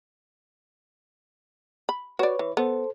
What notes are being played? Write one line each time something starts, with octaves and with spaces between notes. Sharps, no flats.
B5
F#4 B4 C#5 D5
E3
B3 A4 C5